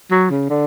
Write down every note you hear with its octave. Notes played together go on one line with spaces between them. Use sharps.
F#3
C#3
D3